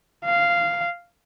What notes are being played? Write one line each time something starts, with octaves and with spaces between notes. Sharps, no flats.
F5